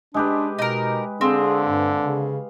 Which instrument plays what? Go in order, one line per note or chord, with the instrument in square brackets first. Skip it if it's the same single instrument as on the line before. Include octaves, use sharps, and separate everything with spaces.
[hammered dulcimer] G#3 G4 B4 [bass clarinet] D4
[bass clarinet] B2 [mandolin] D#4 A#4
[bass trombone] D3 [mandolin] C4 [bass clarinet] G#4 [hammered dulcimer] F5
[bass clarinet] G2
C#3